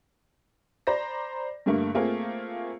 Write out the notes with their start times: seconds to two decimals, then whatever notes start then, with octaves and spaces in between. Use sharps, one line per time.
0.87 C5 D5 A#5 B5 A#6
1.66 G2 D3 A3 A#3
1.95 A3 A#3 C4 F4 G#4